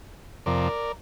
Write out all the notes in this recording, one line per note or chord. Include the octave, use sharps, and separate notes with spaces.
F2 C3 F3 A#4 D5